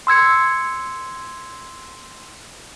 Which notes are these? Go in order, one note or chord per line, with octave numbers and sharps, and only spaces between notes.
C6 E6 G#6 C#7